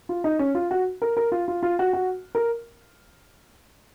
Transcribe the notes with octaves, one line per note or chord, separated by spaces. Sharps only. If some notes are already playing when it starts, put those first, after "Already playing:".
F4
D#4
C#4
F4
F#4
A#4
A#4
F4
F4
F4
F#4
F#4
A#4